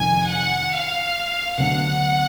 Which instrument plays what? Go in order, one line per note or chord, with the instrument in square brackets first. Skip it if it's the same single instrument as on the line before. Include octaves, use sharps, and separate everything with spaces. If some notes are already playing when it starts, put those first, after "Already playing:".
Already playing: [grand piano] F1 F2 D#3 [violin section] G#5
[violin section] F#5
F5
[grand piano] D2 D3 F#3 B3 D4 [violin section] F#5